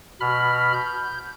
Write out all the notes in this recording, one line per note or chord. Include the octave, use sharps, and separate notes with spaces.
B2 B5 F6
G6